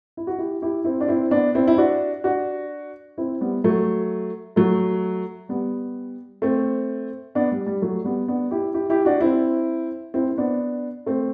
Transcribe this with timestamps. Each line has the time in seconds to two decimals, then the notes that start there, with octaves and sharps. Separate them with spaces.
0.17 E4
0.27 F#4
0.39 E4 G4
0.62 E4 G4
0.84 C4 E4
1.01 D4
1.08 C4 E4
1.31 B3 D4
1.55 C4 E4
1.68 E4
1.78 D4 F#4
2.24 D4 F#4
3.18 C4 E4
3.41 G3 B3
3.64 F#3 A3
4.56 F#3 A3
5.49 G3 B3
6.42 A3 C4
7.35 B3 D4
7.51 G3
7.66 G3
7.82 F#3 A3
8.04 G3 B3
8.28 B3 D4
8.51 E4 G4
8.74 E4 G4
8.90 E4 G4
9.05 D4 F#4
9.21 C4 E4
10.14 C4 E4
10.31 C4
10.38 B3 D4
11.06 A3 C4